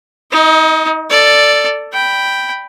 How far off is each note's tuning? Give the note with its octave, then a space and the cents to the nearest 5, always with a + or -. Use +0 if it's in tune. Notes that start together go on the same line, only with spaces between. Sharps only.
D#4 +35 D#5 +0
A4 +10 D5 +0
G5 +0 B5 +0